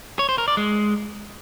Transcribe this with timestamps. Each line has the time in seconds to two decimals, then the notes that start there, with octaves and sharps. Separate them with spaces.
0.19 C#5
0.29 C5
0.38 A#4
0.48 D5
0.57 G#3